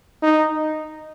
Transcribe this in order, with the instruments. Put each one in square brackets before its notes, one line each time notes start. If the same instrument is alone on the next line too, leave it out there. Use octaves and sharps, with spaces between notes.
[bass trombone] D#4